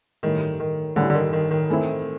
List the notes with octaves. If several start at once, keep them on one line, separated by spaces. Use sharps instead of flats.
A1 G2 D#3 E3 A3
D#3
A1 G2 D3 E3 A3
D3
D#3
D#3
D#3
A2 E3 A3 C4 E4